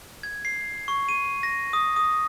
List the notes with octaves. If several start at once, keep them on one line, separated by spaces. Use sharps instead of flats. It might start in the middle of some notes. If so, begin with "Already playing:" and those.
G#6
C7
C#6
D#7
A#6
D#6
D#6